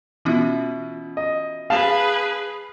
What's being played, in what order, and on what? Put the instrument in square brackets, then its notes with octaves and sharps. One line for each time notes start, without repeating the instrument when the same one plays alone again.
[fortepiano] B2 E4 [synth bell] E3 C#4 F4
[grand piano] D#5
[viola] G#4 B4 [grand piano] F5 A5 E7